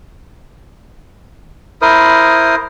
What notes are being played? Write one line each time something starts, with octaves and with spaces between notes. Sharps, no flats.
E4 A#4 C5 D#6